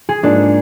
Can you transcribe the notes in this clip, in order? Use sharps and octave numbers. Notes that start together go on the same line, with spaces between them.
G#4
G#2 F3 A#3 D4 D#4